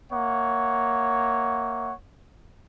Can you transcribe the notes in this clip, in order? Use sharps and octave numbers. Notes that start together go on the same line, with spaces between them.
A#3 C#5 E5 F#5